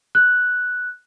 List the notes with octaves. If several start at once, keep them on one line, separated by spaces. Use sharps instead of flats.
F#6